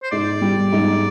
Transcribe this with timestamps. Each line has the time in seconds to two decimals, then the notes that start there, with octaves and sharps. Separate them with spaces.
0.03 C5
0.11 G#2 D5
0.41 G3
0.73 G#2